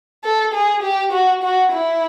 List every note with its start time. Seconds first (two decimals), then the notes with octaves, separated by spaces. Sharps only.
0.24 A4
0.53 G#4
0.83 G4
1.12 F#4
1.43 F#4
1.73 E4